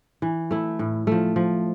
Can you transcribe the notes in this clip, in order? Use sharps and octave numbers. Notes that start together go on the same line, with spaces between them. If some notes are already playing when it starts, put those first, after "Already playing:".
E3
A3 E4
A2
F3 A3
F3